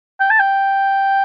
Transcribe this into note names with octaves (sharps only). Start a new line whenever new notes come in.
G5
A5
G5